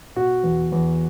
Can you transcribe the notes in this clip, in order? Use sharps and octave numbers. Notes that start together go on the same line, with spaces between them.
B2 F#4
E2
E2